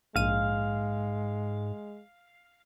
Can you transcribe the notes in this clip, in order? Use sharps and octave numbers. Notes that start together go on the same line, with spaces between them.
A#1 G#2 G#3 F5 D#7